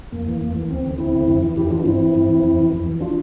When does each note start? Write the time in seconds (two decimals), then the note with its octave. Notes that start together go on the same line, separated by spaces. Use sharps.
0.12 F2 A#3
0.26 E3
0.41 F2
0.55 E3
0.70 D2 C4
0.85 D3
0.98 D2 C4 E4
1.13 D3
1.28 F2
1.42 E3
1.56 F2 E4 G4
1.71 E3 D4 F4
1.85 G2 C4 E4
2.00 E3
2.15 G2
2.29 E3
2.44 F2
2.58 E3
2.72 F2
2.86 E3
3.01 D4 F4